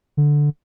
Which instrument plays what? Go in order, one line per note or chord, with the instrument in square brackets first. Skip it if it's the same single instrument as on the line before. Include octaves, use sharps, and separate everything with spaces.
[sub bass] D3